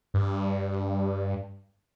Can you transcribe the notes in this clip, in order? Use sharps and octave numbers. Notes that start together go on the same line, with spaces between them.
G2